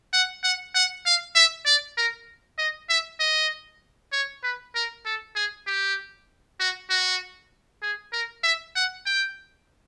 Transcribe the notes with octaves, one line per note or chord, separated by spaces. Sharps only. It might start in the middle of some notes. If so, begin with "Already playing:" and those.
F#5
F#5
F#5
F5
E5
D5
A#4
D#5
E5
D#5
C#5
B4
A#4
A4
G#4
G4
F#4
F#4
G#4
A#4
E5
F#5
G5